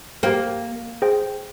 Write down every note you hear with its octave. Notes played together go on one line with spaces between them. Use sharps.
A#3 G4 C5 G5
G#4 C5 G5